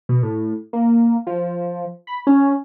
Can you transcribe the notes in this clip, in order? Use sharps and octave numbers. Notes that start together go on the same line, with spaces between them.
B2
A2
A#3
F3
B5
C#4